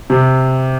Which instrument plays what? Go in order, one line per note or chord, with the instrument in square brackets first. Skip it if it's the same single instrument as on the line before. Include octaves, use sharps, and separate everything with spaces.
[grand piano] C3